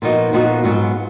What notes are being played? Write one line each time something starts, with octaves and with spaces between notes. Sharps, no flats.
A#2 F3 B3 D#4 F#4
A#2 F3 B3 D#4 F#4
G#2 F#3 B3 F4